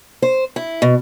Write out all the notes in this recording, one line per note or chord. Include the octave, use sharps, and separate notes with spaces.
C5
E4
B2